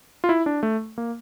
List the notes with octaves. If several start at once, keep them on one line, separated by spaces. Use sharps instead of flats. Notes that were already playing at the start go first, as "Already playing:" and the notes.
F4
E4
D4
A3
A#3